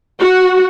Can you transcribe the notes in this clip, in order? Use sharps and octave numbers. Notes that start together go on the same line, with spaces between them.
F#4